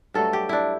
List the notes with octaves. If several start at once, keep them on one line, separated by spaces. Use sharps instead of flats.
G2 F#3 A3 A4
G4
D4 E4